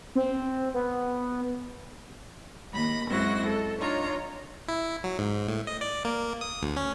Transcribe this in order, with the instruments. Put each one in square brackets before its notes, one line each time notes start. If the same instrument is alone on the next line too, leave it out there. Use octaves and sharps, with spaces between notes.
[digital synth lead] C4
B3
[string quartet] D#2 B5 A#6
F#2 G#3 C4 E4 F#4 A#6
A4
D4 D#4 F4 C#5 A#5
[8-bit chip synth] E4
F#3
G#2
A2
D#5
D5
A#3
D#6
D2
C#4